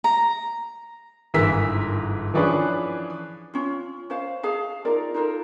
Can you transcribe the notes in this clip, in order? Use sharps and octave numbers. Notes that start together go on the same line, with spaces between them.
A#5
G1 G#2 E3 A#4 E6 B6
E3 F3 C#4 D4 G#4 B4
C#4 F4
C#4 C5 F5
G#4 F5 A5
D#4 F4 A#4 D5
D#4 F4 A4 A#4